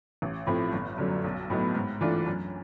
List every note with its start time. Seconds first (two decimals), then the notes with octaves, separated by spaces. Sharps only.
0.22 A1
0.47 A2 F3 A3 C4
0.73 G1
0.98 F#2 D3 F#3
1.24 B1
1.50 A2 F#3 B3 D#4
1.75 G#2
2.01 E3 A3 D4 F4
2.26 F#2